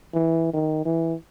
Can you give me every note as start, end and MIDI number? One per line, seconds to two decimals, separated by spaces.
0.14 0.53 52
0.54 0.84 51
0.85 1.14 52